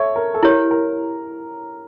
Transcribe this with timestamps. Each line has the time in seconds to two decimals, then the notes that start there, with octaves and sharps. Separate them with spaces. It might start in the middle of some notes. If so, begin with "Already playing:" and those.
Already playing: A4 C#5 E5
0.16 A#4
0.34 A4
0.43 E4 G4 A#4 C#5
0.71 A#4